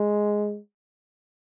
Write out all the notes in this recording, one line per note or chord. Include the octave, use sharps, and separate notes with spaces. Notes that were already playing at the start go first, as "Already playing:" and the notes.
Already playing: G#3